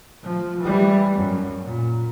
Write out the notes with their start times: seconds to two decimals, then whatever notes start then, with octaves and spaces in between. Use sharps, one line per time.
0.23 F3
0.61 E3 G3
1.15 F#2
1.63 A#2